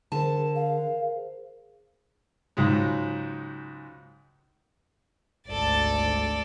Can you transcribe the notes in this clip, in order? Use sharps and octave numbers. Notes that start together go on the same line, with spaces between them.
D3 G#4 A#4 C5 A5
F5
C#2 G#2 F#3 G#3
G#1 D2 A4 D5